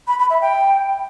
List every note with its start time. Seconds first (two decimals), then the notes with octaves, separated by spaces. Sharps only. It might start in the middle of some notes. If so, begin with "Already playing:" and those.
0.08 B5
0.19 B5
0.30 E5
0.41 G5